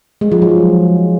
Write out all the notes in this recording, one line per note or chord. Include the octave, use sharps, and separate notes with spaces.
G#3
F3
F#3